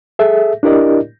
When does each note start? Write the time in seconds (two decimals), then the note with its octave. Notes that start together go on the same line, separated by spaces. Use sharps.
0.19 G#4 A4 E5
0.63 D4 E4 G4 A#4 D5 D#5